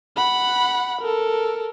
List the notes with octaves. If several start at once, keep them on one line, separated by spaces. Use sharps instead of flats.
F#5 B5
A4 A#4